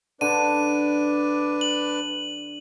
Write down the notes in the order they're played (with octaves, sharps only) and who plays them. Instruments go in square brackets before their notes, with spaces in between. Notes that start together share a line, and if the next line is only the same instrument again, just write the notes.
[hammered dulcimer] D3 [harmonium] D4 B4 D5 [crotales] D#7
[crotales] F#7